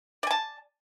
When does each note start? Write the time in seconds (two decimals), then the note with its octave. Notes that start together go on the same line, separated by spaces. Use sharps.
0.23 D5
0.27 G#5
0.31 A5